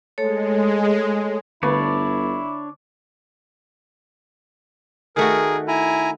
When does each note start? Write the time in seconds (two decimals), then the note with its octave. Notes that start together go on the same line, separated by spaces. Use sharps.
0.18 G#3 A3 A4 C#5
1.63 G1 D3 A3 D4 E4 B4 C#5 D5
5.17 D#3 A3 F#4 G#4 A#4
5.68 E4 G#5 A#5